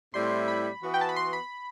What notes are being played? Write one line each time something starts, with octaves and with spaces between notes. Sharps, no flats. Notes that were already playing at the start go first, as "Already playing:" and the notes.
A2 G3 C4 E4 C6
B5
E3 B3 F#4
G5
A5
B5
C6
B5